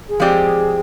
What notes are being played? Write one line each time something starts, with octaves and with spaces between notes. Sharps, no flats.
G#4
F3 G#3 C4 G4 D5